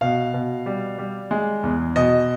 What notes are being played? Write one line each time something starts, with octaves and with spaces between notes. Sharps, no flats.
B2 F5
B2
G3
G3
G#3
E2
B2 D#5